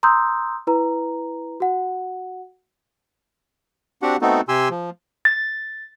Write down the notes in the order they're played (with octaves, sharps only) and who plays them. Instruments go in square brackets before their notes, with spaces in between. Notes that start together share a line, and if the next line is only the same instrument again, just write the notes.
[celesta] A#5 C6 D#6 E6 G6
E4 B4 A#5
F#4 F#5
[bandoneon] C4 D4 F#4 G4 F#5
A3 B3 C4 D#4 F#4 A4
C3 G4 G#5 C6 E6
F3
[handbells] A6